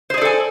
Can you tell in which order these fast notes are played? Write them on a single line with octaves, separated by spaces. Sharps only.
C5 G#4 D5 A4 G#5